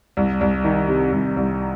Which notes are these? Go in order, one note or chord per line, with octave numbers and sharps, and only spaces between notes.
C2
C2
D#3
C3
C2
C2